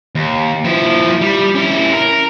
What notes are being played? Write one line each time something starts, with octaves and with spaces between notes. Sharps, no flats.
D#2
F3 E4
G3
C#4 E4
A#4